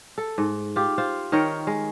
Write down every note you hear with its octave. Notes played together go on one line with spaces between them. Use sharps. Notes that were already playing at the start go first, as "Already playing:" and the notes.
A4
G#2
F4 G4
F4 C5
D#3 A#4 C#5 G5
G#3